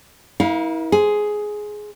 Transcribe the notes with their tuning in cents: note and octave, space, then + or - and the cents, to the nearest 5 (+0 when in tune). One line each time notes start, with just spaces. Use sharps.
E4 -30 A#4 +35 F5 +0
G#4 +10 C5 +0